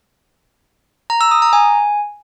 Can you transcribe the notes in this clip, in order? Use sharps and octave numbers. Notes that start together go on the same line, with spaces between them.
A#5
E6
D#6
A#5
G#5